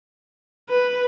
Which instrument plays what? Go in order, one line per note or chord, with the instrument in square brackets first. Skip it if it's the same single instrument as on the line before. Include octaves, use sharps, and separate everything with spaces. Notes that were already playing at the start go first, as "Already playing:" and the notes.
[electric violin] B4